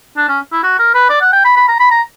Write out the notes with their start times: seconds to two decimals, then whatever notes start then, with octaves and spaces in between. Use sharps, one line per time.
0.17 D4
0.29 C#4
0.52 E4
0.63 F#4
0.79 A#4
0.94 B4
1.10 D5
1.21 F#5
1.33 G5
1.45 B5
1.56 B5
1.68 A#5
1.80 B5
1.91 A#5